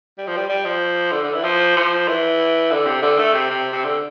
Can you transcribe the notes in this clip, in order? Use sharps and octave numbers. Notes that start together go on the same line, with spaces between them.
G3
F3
G3
G3
F3
D3
D3
E3
F3
F3
E3
D3
C3
D3
A3
C3
C3
C3
D3